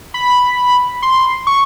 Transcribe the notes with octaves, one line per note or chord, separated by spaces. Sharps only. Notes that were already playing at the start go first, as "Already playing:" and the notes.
B5
C6
C#6